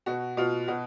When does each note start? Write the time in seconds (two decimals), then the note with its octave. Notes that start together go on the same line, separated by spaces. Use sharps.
0.06 B2 F#4
0.37 B2 F4
0.68 B2 F#4